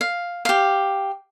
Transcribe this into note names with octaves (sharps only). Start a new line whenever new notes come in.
F5
G4 F5